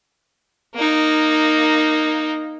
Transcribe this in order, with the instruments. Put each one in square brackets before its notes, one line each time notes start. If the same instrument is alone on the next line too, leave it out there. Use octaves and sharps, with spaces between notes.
[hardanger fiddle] A#3 D#4